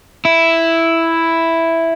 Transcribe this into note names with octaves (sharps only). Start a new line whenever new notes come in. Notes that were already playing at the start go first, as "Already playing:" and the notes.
E4